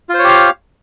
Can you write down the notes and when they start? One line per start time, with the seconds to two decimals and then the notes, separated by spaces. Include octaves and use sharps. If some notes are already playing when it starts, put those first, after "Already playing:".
0.09 F4
0.14 C5
0.19 C#5
0.24 G4
0.29 F5